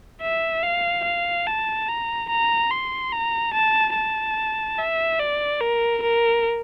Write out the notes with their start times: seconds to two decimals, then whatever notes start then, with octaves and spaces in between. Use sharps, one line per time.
0.22 E5
0.63 F5
1.05 F5
1.47 A5
1.88 A#5
2.29 A#5
2.71 C6
3.12 A#5
3.54 A5
3.95 A5
4.78 E5
5.20 D5
5.61 A#4
6.02 A#4